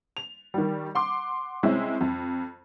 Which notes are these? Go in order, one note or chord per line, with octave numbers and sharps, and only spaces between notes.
F7
D#3 G3
F#5 C6 D6
C3 G#3 C4 C#4 E4
F2